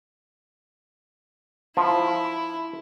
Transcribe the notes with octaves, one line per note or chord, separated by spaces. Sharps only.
F3 E4